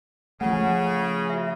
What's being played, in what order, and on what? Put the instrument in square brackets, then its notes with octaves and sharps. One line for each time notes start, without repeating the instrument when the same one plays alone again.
[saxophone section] C#3 [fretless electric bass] F3 A3 [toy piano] F#5 G#5
[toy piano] F#4 E5